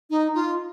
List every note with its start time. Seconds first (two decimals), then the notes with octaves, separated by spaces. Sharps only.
0.10 D#4
0.35 F4